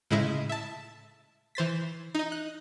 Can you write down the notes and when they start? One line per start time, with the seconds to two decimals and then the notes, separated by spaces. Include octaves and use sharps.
0.11 A2 C#3 G#3 E4 D#5 E5
0.49 E5 A5
1.55 E3 C5 A6 B6
2.15 D#4 D#5
2.32 F#6